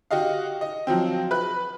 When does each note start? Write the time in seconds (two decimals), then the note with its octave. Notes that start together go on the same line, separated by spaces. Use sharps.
0.11 F#4 G4 D#5 F5
0.61 D#5
0.87 F3 F#3 C4
1.31 B4 B5 F#6